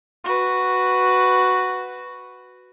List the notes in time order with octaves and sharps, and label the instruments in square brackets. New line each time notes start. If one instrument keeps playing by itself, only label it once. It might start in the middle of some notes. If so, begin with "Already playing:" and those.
[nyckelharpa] F#4 B4